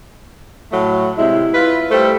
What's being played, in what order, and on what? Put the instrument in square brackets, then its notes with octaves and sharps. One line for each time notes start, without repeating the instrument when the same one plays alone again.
[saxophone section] A2 F#3 A3
[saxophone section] C3 G#3 [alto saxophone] E4
[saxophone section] F4 B4
[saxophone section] G3 A3 [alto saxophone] C5